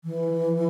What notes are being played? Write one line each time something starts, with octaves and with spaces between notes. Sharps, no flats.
E3